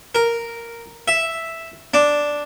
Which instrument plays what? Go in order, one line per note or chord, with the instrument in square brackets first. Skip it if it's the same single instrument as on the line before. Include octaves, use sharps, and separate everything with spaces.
[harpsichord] A#4
E5
D4